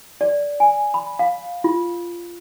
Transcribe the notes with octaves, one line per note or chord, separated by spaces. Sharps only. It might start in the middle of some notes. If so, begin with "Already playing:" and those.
D5
G#5
B5
F5
F4